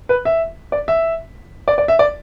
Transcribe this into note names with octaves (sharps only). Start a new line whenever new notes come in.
B4
E5
D5
E5
D5
D5
E5
D5